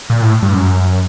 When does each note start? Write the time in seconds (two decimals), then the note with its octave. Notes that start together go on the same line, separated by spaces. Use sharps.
0.10 A#2
0.22 A2
0.42 G2
0.53 F#2